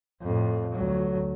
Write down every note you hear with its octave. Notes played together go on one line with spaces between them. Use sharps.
F2 A2
D2 F#3